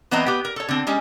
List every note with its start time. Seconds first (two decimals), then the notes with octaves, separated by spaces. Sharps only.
0.11 E3 B3 C4 C#5 D#5 A#5
0.26 B3 G4
0.45 A#4
0.56 A4 C#5
0.69 D3 C4
0.87 G3 G#3 C#4